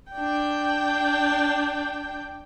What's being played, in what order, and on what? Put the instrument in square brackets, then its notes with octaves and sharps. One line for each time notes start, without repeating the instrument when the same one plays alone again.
[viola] D4 G5